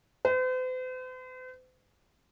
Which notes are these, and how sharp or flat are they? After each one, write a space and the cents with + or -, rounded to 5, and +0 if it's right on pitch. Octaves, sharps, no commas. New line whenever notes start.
C5 -45